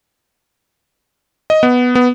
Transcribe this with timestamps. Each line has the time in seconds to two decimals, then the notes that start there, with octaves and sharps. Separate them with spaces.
1.50 D#5
1.63 B3
1.95 B3